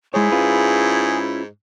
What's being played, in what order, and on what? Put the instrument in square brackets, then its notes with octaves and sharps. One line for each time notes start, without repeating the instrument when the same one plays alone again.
[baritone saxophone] G#2 [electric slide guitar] G#3 C#5 [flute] E4 [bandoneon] G#4
[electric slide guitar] C#4 F4 B4